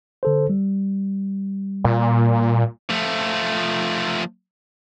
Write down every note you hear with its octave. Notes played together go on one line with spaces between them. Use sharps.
D3 A4 C5
G3
A#2
F3 A3